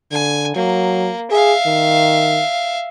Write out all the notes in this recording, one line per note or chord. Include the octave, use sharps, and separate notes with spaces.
D3 G#5
F#3 A#3
G#4 E5 F5
D#3